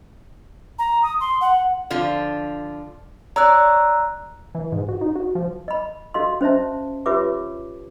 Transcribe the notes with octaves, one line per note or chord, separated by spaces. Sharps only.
A#5
D#6
C6
F#5
D3 F3 F4
C#5 D5 A#5 E6 F#6
E3
G#2
F#4
D#4
F#4
F3
D#5 B5
F#4 A4 D#5 F5 C6
C#4 C5 D#5 E5 A5
F4 G4 B4 C#5 E5 D6